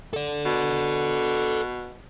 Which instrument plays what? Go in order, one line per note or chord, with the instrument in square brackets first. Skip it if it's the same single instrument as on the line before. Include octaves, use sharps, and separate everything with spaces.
[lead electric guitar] A4 D5
[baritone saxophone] B2